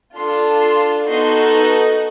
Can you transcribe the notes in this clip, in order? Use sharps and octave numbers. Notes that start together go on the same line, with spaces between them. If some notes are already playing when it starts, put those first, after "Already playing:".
D4 F4 A4 C6
C6
B3 D#4 F#4 A4 C6